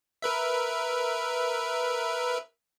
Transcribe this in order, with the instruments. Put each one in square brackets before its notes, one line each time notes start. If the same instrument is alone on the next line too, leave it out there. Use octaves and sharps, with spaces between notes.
[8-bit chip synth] A#4 B4 E5